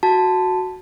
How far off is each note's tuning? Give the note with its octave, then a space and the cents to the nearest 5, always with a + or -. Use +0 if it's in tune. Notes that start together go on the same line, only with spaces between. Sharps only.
F#4 -5 A5 +0